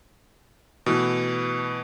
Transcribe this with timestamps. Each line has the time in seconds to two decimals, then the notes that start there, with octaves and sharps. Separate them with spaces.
0.86 B2 E3 A3